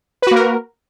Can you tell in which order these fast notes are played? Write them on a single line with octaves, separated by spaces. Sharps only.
B4 F#4 A#3 A#4